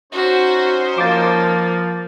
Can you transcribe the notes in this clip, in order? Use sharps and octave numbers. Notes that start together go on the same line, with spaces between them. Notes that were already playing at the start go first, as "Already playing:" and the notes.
C#4 D#4 F#4 C5
F3 A#3 D6 A6